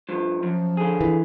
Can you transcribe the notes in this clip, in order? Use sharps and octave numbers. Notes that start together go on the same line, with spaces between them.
G2 F3
F#2 F3
D3 G#4
E3